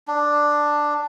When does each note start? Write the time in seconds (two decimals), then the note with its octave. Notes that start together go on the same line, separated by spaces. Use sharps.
0.08 D4